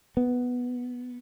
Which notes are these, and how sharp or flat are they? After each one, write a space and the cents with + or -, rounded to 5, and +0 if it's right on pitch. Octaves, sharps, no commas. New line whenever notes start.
B3 +0